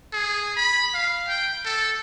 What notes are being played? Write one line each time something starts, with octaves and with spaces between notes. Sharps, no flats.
G#4
B5
F5
G5
A4